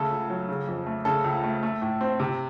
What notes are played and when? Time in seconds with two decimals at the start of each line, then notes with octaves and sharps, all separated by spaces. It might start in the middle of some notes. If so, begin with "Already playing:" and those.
Already playing: C#3 A3 A4
0.11 C#2
0.30 F#3
0.49 C#3
0.67 F2
0.86 A3
1.05 C#3 A4
1.24 C#2
1.44 A3
1.63 A3
1.82 A2
2.01 C4
2.20 C3